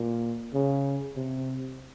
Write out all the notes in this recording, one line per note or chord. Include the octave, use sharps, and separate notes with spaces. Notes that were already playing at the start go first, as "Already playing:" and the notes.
Already playing: A#2
C#3
C3